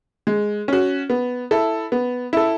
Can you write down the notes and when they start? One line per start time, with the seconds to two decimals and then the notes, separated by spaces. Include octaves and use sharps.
0.27 G#3
0.68 C#4 F#4
1.10 B3
1.51 E4 A4
1.92 B3
2.33 E4 A4